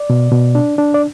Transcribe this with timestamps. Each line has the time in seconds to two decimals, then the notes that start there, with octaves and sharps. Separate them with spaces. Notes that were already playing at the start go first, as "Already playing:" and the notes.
Already playing: D5
0.10 B2
0.32 B2
0.55 D4
0.78 D4
0.94 D5